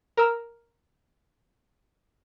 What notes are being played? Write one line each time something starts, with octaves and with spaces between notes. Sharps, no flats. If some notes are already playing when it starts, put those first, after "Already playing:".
A#4 E6